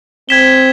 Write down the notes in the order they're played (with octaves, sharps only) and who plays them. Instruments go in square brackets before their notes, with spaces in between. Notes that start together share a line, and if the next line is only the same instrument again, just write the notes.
[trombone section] C4 [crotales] G#6 B6 E7 G7